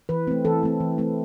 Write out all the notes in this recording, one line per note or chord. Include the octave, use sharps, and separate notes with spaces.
E3 B4
A3 C4
E3 A4
A3 C4
E3
A3 C4